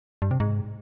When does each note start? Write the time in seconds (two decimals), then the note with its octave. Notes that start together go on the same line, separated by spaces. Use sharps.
0.22 G2
0.31 C3
0.40 G#2